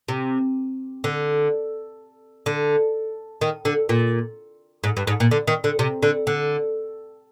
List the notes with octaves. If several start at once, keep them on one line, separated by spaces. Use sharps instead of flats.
C3
D3
D3
D#3
D3
A#2
G#2
G2
G#2
A#2
D3
D#3
D3
C3
D3
D3